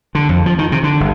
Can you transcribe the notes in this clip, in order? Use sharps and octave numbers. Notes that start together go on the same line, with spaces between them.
D3
F2
F3
D#3
C3
D3
G1